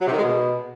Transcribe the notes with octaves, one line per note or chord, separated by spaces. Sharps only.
F#3
C3
D#3
G#3
B2